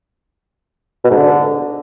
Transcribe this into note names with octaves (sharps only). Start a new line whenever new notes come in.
B2
G#2
D3